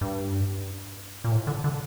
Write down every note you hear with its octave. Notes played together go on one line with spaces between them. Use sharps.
G2
A#2
A2
D3
D3